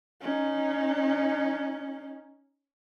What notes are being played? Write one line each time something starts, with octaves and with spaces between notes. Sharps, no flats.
C#4 D#4